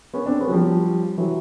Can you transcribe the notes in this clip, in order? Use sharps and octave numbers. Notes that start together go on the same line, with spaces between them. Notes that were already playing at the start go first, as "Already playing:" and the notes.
B3 C#4
C4 D4
B3 C#4
F#3
F3 G3
E3 F#3